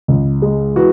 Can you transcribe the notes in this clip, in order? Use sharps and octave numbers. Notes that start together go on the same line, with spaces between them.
C#2
G#3
E3 F#4